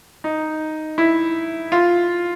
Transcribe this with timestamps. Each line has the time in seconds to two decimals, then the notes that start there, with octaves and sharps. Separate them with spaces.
0.24 D#4
0.98 E4
1.72 F4